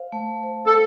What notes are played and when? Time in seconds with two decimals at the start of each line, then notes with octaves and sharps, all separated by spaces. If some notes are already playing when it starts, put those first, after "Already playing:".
Already playing: C5 F5
0.12 A3
0.43 C5
0.66 A4